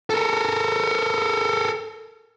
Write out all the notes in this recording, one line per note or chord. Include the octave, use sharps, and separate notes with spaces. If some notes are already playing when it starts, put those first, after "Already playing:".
A4 A#4